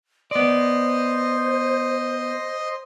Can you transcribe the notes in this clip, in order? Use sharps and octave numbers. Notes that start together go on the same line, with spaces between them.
B3 C5 D5 D#5 C6